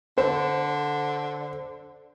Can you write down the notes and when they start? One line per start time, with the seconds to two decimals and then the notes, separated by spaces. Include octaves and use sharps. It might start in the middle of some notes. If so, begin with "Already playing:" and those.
0.18 D3 C5